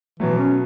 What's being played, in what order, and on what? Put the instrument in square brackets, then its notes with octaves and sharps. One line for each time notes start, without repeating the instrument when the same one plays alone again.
[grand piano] B2 F#3 A3 [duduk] E3
[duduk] C#4